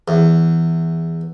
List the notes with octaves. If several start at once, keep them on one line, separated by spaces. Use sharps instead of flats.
E2